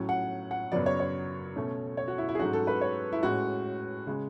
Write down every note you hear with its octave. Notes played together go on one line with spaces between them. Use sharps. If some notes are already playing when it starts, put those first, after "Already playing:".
Already playing: A2 F#3 C#4
F#5
F#5
F#2 C#3 F#3 B3 D5
C#5
C#5
B2 A3 C#4
C#5
F#4
E4
E4
G#4
G#2 F#3 A3 C#4 F#4
A4
B4
C#5
E4
A2 G#3 C#4 F#4
C#3 G#3